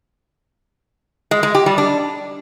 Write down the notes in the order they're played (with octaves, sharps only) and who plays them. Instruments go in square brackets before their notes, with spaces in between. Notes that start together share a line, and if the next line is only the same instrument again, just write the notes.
[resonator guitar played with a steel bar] G#3
G#3
G4
G3
D4